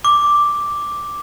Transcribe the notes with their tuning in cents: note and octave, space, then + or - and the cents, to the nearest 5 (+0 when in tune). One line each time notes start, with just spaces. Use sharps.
D6 +0